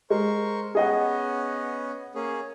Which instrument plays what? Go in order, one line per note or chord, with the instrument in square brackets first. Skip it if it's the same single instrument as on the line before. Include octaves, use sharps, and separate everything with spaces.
[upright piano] G#3 [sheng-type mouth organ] A#4 C5 C#6
[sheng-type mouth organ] B3 C#4 [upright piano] G#4 D#5 F#5
[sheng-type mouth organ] A#3 C#4 G#4